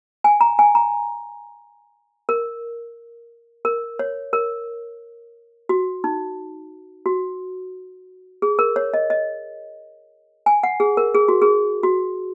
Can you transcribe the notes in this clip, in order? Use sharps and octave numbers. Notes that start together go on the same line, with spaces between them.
G#5
A#5
G#5
A#5
A#4
A#4
C#5
A#4
F#4
D#4
F#4
G#4
A#4
C#5
D#5
D#5
G#5
F#5
G#4
A#4
G#4
F#4
G#4
F#4